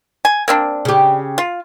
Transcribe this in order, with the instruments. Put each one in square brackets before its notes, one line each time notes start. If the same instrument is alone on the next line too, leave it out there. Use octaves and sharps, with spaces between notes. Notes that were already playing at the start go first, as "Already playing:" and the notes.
[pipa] G#5
A#3 C4 D4
[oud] C#3 G4
[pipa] F4